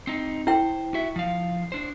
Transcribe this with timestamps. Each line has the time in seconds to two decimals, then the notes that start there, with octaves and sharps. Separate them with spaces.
0.07 C4 D#4
0.47 E4 C5 G5
0.94 F#4 E5
1.16 F3 F5
1.72 D4 C5